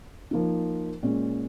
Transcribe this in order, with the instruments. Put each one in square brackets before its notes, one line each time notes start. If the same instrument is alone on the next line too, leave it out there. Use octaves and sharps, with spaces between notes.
[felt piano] F3 A#3 D#4
A#2 G#3 C#4